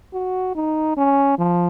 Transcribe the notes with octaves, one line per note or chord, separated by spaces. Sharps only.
F#4
D#4
C#4
F3